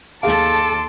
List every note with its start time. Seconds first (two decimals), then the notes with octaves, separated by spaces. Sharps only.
0.23 D#2 G#4 A4 F5 A5 C6 D6